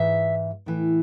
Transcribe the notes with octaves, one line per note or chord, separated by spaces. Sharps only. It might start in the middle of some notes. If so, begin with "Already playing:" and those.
Already playing: G#2 E3 E5
A2 E3